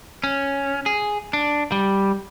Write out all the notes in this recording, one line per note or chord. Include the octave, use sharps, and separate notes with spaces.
C#4
G#4
D4
G3